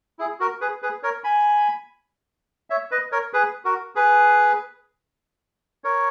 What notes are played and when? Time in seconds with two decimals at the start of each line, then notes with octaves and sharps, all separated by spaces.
0.19 E4 G#4
0.40 F#4 A#4
0.61 G#4 B4
0.82 G#4 B4
1.03 A#4 C#5
1.24 G#5 B5
2.70 C#5 E5
2.91 B4 D#5
3.12 A#4 C#5
3.33 G#4 B4
3.65 F#4 A#4
3.95 G#4 B4
5.84 A#4 C#5